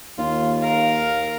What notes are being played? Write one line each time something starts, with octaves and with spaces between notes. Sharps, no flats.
D#2 F4
A#4 F5